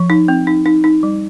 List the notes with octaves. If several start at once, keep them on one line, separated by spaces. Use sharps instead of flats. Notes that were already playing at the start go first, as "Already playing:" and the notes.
Already playing: F3
D#4
C4
D#4
D#4
D#4
G3